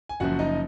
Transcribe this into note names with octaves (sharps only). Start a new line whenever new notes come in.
G#5
F#1 F#2 F3 F#4 F#5
D#4 D#5